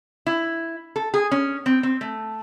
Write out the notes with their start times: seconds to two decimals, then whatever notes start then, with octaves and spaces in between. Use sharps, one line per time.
0.26 E4
0.96 A4
1.14 G#4
1.31 C#4
1.66 C4
1.83 C4
2.01 A3